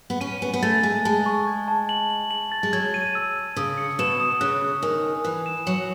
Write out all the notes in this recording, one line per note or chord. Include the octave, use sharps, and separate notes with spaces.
B3
C#4 D#7
B3 G#5
B3
A3 A6
G#3 G#5
G#3 A5
C#6
G#6
A5
F#7
F#7
F#7
A6
G#3
F#3 G#6
D#7
E6
E6
C#3 D#6
C#7
B2 E7
D#6
C#3 F#6
F#6
D#3 G#5
G#5
E3 F#6
E7
F#3 C#7